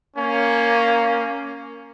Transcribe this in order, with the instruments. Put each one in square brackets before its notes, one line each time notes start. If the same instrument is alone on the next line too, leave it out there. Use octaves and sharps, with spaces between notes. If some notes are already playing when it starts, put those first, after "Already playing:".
[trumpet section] A#3 C#4